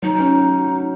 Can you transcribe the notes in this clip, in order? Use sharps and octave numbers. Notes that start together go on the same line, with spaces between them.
F#3 D#4
C#4
F#4